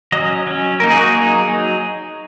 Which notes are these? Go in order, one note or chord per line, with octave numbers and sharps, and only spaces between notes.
F#3 C#4 D#5
F#3 C#4
F#3 A#3 D#4 A#4
G#4
F#4
F#3 A#3 D#4 G#4
F#3 D#4